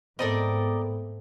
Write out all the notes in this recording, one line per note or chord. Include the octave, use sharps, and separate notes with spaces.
G#2 A3 B3 C4 A4 A#4 D5 D#5